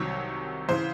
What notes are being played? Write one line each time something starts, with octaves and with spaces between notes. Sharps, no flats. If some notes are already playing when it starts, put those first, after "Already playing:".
Already playing: C2 C3 D#3 F#3 C#5
C#3 E3 C5